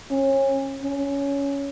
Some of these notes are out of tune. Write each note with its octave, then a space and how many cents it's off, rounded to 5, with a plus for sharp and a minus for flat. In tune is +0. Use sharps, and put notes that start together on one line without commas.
C#4 -30
C#4 +15